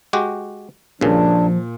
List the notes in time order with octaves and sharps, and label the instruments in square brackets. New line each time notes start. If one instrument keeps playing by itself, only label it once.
[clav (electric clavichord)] G#3 F#4 G4
[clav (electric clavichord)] G2 C#3 [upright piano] A#2 [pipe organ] F3 [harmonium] D4